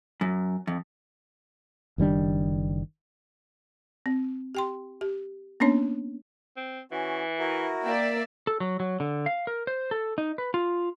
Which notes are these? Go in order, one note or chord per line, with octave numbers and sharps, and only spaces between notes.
F#2
F2
F#1 D#3 G3 D4
C4
G4 G5 C6
G4
A#3 B3 C#4 D4 C#5
C4
E3 C#4 F#4
E4 F#4 A#4
A#3 D5 E5 G5
A4
F#3
F#3
D3
F5
A#4
C5
A4
D#4
B4
F4